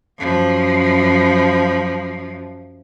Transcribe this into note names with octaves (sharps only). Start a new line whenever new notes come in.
F#2 F3